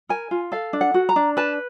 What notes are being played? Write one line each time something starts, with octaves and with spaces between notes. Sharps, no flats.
A#4 G#5
F4
A4 F5
D4
F#5
F#4
A#5
D4
B4 A5